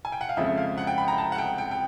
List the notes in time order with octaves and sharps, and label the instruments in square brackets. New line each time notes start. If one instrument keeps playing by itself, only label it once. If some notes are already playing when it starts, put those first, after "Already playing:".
[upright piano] G#5
G5
F#5
F5
F2 C#3 F3 G#3 E5
F5
F#5
G5
B5
A#5
A5
F#5
G5
G5
G5